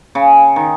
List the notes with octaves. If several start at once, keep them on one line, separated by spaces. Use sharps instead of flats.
C#3
D#3